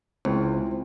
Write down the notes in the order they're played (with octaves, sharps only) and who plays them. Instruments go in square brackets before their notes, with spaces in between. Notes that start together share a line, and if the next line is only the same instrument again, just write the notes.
[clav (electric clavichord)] C#2 [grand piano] C4 E4